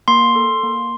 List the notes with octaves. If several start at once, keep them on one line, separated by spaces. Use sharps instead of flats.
A#3 C6
A4
A#3